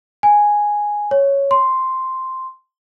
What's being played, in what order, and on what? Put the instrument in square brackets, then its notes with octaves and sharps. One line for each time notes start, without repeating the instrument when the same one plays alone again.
[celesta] G#5
C#5
C6